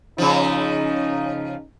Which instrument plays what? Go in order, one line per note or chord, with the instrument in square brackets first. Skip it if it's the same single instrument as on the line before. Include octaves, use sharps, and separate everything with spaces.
[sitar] C#3 F3 [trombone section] C#4 D#4